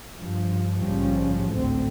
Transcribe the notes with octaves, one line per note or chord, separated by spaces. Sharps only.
G2 F3
A#1 G#2 C#3 F3 G3 C#4
A1 D2 G#2 D3 A3 C4